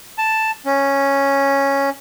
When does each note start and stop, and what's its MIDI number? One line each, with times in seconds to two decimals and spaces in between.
0.18 0.51 81
0.65 1.90 61